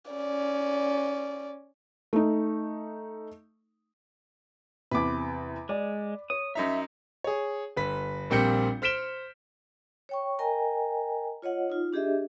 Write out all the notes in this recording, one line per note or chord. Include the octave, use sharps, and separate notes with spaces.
C#4 D5
A3 D#4
E2 C3 B4 D6
G#3 D5
C#5 D#6
F#2 D#4 E5 A#5
G#4 C#5
G1 B4 B6
A#1 A#2 G3 C4 G6 C#7
C5 F6 B6 D7 E7 G7
C#5 G5 C#6
A#4 D#5 G5 G#5 A#5
F4 C#5 D#5 F#5
D#4 F4
D4 G4 G#4 D#5 E5